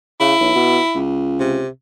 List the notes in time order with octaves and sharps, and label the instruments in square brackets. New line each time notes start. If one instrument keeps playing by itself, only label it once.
[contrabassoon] C#3 [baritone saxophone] E4
[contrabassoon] B1
B2
C#2
[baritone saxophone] C3